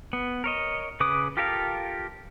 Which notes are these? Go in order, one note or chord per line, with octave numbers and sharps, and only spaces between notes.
B3
A#4 C#5 D#5
C#3 B4 D6 D#6
F4 G4 A4 A#4 F5